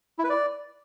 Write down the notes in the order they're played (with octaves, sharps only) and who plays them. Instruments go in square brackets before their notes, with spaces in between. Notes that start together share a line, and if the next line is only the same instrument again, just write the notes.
[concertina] E4
B4
D5